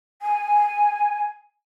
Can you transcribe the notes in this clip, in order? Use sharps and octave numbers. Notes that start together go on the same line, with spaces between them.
G#5